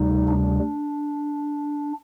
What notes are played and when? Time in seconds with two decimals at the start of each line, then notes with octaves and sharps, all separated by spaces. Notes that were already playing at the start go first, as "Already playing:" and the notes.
Already playing: D2 C3 G3 D#4
0.28 D4